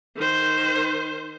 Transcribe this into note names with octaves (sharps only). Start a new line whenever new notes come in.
D#3 C5